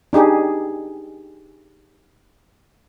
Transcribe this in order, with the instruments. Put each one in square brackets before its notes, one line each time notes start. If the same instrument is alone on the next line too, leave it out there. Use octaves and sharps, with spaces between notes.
[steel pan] D4 D#4 G4 G#4